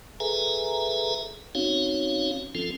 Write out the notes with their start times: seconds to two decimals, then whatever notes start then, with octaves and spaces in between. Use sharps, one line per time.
0.20 G#4 A4 B4 E5 G#5 A#5
1.55 C4 C#4 D#4 F#4 C#5 F5
2.55 F3 C4 C#4 F4 A4